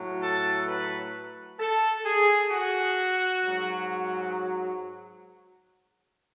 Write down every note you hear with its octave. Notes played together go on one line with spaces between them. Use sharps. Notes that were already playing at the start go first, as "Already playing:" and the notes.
Already playing: A2 F#3
A4
B4
A4
G#4
F#4
G#2 F#3